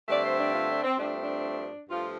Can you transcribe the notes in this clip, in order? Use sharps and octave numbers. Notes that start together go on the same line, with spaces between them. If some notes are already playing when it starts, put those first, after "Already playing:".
G2 D3 A3 C4 D5
C5
D4
F4
D4
C4
G2 F3 A3 C4 D4
D4
G2 F3 A3 F4